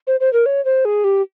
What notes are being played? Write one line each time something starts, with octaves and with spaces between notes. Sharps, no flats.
C5
C5
A#4
C#5
C5
G#4
G4